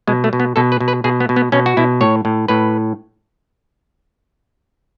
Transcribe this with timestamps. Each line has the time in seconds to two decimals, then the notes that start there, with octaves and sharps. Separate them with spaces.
0.07 B2 G#3
0.24 A3
0.33 B2
0.40 B3
0.56 B2 A4
0.72 B4
0.80 B2
0.88 B4
1.04 B2 G#4
1.20 B3
1.29 B2
1.36 B3
1.52 B2 C#4
1.66 F#4
1.77 B2 E4
2.01 A2 C#5
2.25 A2
2.48 A2 B4